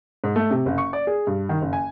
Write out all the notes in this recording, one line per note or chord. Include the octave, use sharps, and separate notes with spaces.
G#2
A3
C3
F#1
C#6
D5
G#4
G2
D#3
F#1
G#5